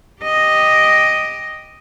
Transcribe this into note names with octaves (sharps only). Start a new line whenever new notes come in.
G4 D#5